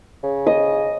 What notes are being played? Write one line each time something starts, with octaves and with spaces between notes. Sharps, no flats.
C#3
D#5